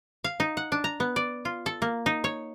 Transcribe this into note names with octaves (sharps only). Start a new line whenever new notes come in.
F5
D#4
F#5
D4
A#5
B3
D5
F4
A4
A#3
D#4
C#5